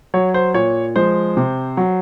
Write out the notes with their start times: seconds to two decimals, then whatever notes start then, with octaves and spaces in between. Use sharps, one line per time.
0.14 F#3 C#5
0.34 C5
0.54 A#2 C#5
0.96 F3 G#3 C5
1.37 C3
1.77 F#3